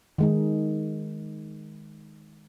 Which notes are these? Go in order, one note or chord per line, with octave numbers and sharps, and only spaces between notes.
D#3 G#3 D#4